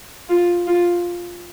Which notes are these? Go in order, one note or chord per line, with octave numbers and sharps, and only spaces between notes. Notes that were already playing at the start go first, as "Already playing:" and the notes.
F4
F4